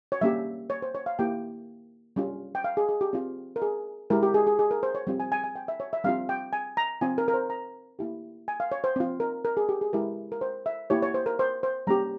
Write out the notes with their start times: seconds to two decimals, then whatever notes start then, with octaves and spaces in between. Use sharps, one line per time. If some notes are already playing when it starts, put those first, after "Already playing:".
0.12 C#5
0.21 G3 A#3 C#4 G4 E5
0.70 C#5
0.82 C5
0.95 C#5
1.06 F5
1.19 A#3 E4 G4 G5
2.16 G3 C#4 F4
2.55 G5
2.64 F5
2.77 G#4
2.89 G#4
3.01 G4
3.13 C4 F4
3.56 A#4
3.62 G#4
4.10 G#3 E4 G4 A#4
4.23 G4
4.34 G#4
4.47 G#4
4.59 G#4
4.71 A#4
4.83 C5
4.95 C#5
5.07 G3 C4 F4
5.20 G#5
5.32 G#5
5.44 G#5
5.56 G5
5.68 E5
5.80 C#5
5.93 E5
6.04 G3 C4 F4 F5
6.29 G5
6.53 G#5
6.77 A#5
7.01 C4 F4 G#5
7.18 A#4
7.28 A#4
7.34 C5
7.50 A#5
7.99 A#3 E4 G4
8.48 G#5
8.60 F5
8.72 C#5
8.84 C5
8.96 C4 F4
9.20 A#4
9.45 A#4
9.57 G#4
9.69 G4
9.81 G#4
9.93 G#3 E4 G4 A#4
10.32 A#4
10.41 C5
10.66 E5
10.90 A#3 E4 G4 C#5
11.03 C#5
11.14 C5
11.26 A#4
11.39 C5
11.63 C5
11.87 G3 A#3 C#4 G4 A#5